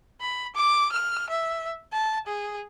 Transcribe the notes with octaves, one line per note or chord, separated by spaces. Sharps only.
B5
D6
F6
E5
A5
G#4